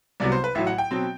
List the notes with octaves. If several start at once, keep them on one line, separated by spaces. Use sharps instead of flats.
C2 C3 F#3 B3 D5
C5
B4
A1 A2 F#3 E5
F#5
G5
B2 F#3 C4